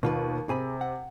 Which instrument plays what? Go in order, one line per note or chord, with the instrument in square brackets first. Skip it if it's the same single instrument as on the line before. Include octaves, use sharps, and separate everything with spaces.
[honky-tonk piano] D#2 [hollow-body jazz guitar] B2 F4 B4
[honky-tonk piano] C3 [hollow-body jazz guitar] G#4 G#5 B5
[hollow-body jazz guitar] F#5